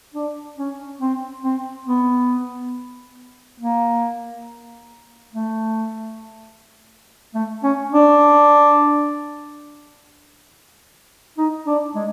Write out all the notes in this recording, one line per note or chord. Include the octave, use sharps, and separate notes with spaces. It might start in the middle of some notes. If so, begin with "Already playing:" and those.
D4
C#4
C4
C4
B3
A#3
A3
A3
C#4
D4
D#4
D4
G#3